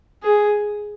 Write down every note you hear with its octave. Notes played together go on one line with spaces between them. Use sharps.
G#4